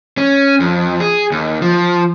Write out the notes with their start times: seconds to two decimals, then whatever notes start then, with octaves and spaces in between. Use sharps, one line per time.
0.18 C#4
0.60 F2
1.00 G#4
1.32 D#2
1.62 F3